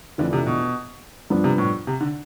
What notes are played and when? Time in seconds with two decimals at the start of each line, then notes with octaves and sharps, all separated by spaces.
0.18 F2 D3 E3 A3 D4
0.33 C3
0.47 B2
1.30 G2 F3 B3 D4
1.44 C3
1.58 A2
1.87 C3
2.01 D3